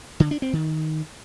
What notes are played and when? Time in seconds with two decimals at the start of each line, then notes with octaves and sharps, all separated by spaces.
0.20 D3
0.31 D4
0.42 C4
0.53 D#3